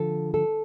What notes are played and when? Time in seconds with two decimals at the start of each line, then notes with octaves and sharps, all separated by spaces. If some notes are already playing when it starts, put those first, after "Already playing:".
Already playing: D3 F3 A4
0.34 A4